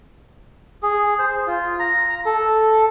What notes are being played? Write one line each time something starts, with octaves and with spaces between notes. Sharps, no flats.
G#4
C5
F4
A#5
A4